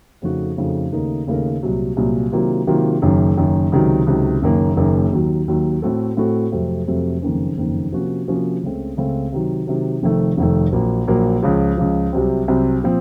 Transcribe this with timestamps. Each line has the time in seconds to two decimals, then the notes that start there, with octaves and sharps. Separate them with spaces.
0.22 F2 C#3 A3 D#4 F#4
0.57 F2 C#3 A3 D#4 F#4
0.92 D#2 C#3 A3 D#4 A#4
1.27 D#2 C#3 A3 D#4 A#4
1.63 C2 A#2 F#3
1.97 C2 A#2 F#3
2.32 C3 D#3 F#3 A#3 F4
2.67 C3 D#3 F#3 A#3 F4
3.02 F#1 F#2 D#3
3.37 F#1 F#2 D#3
3.72 C#2 C3 D#3 F#3
4.07 C#2 C3 D#3 F#3
4.42 F#1 F#2 D#3 A#3
4.77 F#1 F#2 D#3 A#3
5.12 D#2 D#3 F#3
5.48 D#2 D#3 F#3
5.82 A2 A3 C4 F#4 A4
6.17 A2 A3 C4 F#4 A4
6.52 F2 C3 F#3 A3
6.87 F2 C3 F#3 A3
7.22 F#1 F2 D#3 A#3 C#4
7.57 F#1 F2 D#3 A#3 C#4
7.92 C3 F3 A#3 C#4 F#4
8.27 C3 F3 A#3 C#4 F#4
8.63 C#2 C#3 A3 C4
8.97 C#2 C#3 A3 C4
9.32 C3 D#3 F#3
9.67 C3 D#3 F#3
10.03 F1 F2 D#3 A3
10.37 F1 F2 D#3 A3
10.72 A#1 A#2 F#3 A#3
11.07 A#1 A#2 F#3 A#3
11.43 C#2 C#3 F3
11.77 C#2 C#3 F3
12.13 C2 C3 F#3 C4
12.48 C2 C3 F#3 C4
12.82 A#2 F3 C4